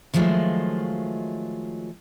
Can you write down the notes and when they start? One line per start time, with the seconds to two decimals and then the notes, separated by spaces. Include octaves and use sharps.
0.14 D#3 F3 F#3 G#3 A3 F4